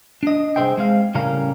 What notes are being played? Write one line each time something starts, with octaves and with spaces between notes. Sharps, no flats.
D4 D#5
C2 F#3 G#4 C5 E5 G5
G#3 C4 F5
A2 C#3 G3 C#4 A#4 F5